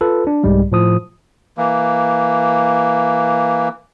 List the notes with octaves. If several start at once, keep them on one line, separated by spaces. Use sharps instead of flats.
F4 A4 B4
D4
C2 G#2 G3 G#3
A2 F3 D#6
E3 A#3